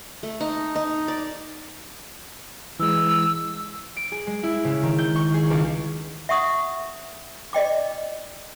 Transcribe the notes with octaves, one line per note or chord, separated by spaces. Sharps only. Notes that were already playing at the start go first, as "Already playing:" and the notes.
A3
D#4
D#4
D5
E3 G#3 E6
D7
G#4
G#3
E4
C#3
D#3
G6
C#6
G#4
C#2
E5 F#5 C#6 D#6
D5 D#5 G5 D6